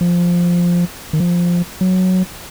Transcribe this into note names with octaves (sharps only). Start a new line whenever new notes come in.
F3
D#3
F3
F#3